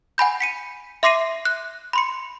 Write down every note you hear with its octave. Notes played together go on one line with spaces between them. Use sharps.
F#5 G#5 B5 G6
B6 C#7 D#7
E5 C6 D6 A#6 C7 D#7
F#6
B5 C6 C#7